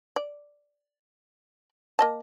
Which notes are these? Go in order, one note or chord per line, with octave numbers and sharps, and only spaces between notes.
D5
A#3 D#5 A5